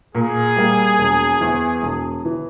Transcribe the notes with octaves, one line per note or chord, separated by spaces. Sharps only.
A#2 G#4
G3 A#3
E1
E2 E3
E1
E3